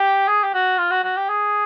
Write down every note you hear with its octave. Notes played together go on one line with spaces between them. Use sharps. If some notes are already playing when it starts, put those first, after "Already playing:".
Already playing: G4
G#4
G4
F#4
F4
F#4
F#4
G4
G#4